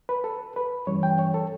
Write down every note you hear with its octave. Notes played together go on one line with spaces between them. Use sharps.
B4
A4
B4
G2 E3 G3 C#4 C#5
G5
C#5
A4